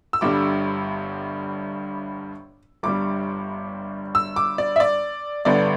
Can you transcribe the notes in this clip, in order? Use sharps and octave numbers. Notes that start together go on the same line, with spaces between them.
E6
G1 G2 D3 G3 D6
G1 G2 G3 D6
E6
D6
D5
E5
D5
G1 G2 D3 B3 D4 D5